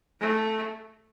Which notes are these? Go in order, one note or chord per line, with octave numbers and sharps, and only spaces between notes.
A3